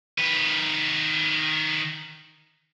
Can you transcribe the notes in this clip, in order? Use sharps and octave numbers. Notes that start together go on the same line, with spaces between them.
D#3 B4